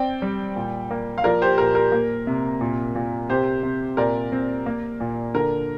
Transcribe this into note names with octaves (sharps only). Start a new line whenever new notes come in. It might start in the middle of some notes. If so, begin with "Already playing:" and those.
Already playing: C4 D5 G5
G3
A#2
A#3
F5
F3 A#4 D5
G4 C5
A#2 A#4
A#4
A#3
C3
A#2
A#2
C3 G4 C5
C3
A#2 A#4 D5
C4
A#3
A#2
D3 A#4